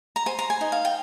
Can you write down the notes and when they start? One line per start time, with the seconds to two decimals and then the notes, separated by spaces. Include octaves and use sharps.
0.16 A#5
0.26 C5 G#5
0.39 A#5
0.50 G#5
0.61 D#4
0.72 F5
0.85 G5